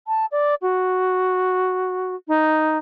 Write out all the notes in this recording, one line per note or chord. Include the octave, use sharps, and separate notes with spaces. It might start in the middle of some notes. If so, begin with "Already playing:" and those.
A5
D5
F#4
D#4